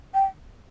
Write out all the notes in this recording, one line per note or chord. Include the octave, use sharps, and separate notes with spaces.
G5